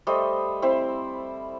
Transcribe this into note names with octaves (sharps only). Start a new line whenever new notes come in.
G3 A3 C5 D#5
C4 E4 C5